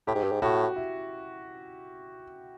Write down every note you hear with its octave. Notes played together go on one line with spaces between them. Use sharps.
A2 G4
G#2
G2
G#2
A2 F#4
E4